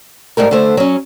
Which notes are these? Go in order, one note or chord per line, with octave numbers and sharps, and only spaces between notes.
G#2 G3 A3 A#4
D3 A3 C5
F#3 C#4